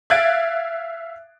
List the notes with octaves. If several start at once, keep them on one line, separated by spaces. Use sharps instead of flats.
E5 F5 F#6 G#6 A6 D7